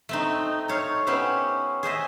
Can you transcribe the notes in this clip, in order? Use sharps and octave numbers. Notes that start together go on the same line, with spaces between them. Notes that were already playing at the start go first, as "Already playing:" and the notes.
A3 C4 D#4
A4 C#5 F5
B3 C#4 E4 G4 C5
G#4 C5 D#5 E5